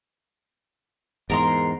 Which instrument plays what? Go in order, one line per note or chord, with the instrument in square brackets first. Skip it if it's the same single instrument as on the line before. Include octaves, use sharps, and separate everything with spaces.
[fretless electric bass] E2 G#2 [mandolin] A#4 A#5 C6